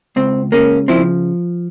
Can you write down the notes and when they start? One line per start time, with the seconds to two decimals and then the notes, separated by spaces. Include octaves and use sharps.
0.16 C#2 C4
0.52 C#3 A#3 C#4
0.88 F3 C4 E4